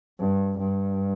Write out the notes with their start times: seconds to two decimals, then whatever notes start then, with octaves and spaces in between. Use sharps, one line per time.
0.19 G2
0.59 G2